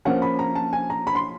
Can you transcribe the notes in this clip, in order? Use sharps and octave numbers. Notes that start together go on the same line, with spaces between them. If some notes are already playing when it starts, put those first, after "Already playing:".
F3 A#3 C#4 F#5
B5
A#5
A5
G#5
A#5
B5
C6